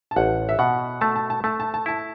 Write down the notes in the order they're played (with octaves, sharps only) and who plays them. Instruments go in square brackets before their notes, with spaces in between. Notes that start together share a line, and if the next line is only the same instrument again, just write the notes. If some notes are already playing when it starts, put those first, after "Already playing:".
[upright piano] A5
[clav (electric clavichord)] A1 [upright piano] F#5
[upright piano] E5
[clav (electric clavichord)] B2 [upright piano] F#5
[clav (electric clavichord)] A3 [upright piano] A5
[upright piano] A5
A5
[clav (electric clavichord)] A3 [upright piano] A5
[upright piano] A5
A5
[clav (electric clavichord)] E4 [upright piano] A5